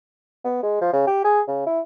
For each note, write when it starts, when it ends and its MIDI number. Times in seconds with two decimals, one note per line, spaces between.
0.44 0.62 59
0.63 0.81 56
0.81 0.90 53
0.93 1.07 49
1.07 1.20 67
1.24 1.41 68
1.47 1.64 49
1.66 1.80 64